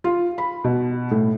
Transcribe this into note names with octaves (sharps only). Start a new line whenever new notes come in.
F4
B5
B2
A2